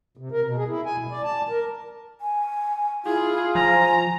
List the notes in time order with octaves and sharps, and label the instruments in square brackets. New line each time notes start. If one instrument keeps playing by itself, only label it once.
[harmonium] C3
A#4
B2
G#4
E4
G#5
B2
D5
A5
A#4
[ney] G#5
[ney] E4 [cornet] F4 [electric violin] G#4
[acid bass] F3 [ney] G#5 [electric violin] A#5